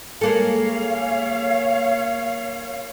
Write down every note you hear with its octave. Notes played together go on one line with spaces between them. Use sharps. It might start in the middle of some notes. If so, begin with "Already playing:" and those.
G#3 A#3 A4 C#5 F5